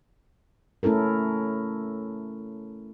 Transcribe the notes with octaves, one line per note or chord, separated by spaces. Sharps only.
A3 C#4 E4 A4 A#4